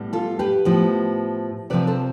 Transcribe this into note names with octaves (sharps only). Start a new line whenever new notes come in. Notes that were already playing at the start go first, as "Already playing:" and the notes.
Already playing: A2 G3 B3
F4 A4
G4 B4
A2 F3 B3
C3 F3 C4 B4 D5
A4 C5